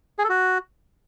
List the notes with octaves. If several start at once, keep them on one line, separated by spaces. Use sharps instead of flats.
G#4
A4
F#4